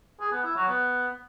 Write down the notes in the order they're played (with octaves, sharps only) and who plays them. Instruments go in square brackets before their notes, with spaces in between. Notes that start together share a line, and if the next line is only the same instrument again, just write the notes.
[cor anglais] G#4
B3
E4
F#3
B3